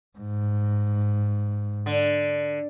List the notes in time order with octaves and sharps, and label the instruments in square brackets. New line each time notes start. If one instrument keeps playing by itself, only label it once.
[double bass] G#2
[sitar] D3